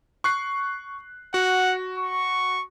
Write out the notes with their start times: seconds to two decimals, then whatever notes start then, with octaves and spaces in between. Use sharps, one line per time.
0.24 C#6 F#6 C7
1.34 F#4 F#5
1.98 C#6